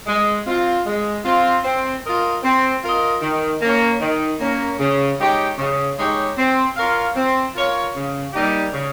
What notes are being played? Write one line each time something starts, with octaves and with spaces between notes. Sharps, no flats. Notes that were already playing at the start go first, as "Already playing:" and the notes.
G#3
C4 F4
G#3
C4 F4
C4
F4 A#4 D#5
C4
F4 A#4 D#5
D#3
A#3 C#4
D#3
A#3 C#4
C#3
G#3 D#4 G4 C#5
C#3
G#3 D#4 G4 C#5
C4
F4 A#4 C#5 F5
C4
F4 A#4 C#5 F5
C#3
G3 A#3 D#4 G4
C#3